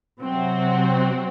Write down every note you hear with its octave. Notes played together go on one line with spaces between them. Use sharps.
C3 F#3 C4 F#4